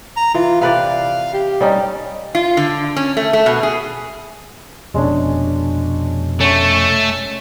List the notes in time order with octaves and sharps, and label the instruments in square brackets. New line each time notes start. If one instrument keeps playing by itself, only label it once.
[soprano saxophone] A#5
[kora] E3 [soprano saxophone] F4
[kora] C3 B4 D5 [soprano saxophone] F5
[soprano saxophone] G4
[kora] G3 C#4 D#4
[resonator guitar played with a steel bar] F4
D3
C#4
A3
A3
B2
G#4
[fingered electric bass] F1 B2 [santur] G#3 C#4 D4
[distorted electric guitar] A3 [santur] C#4 C#6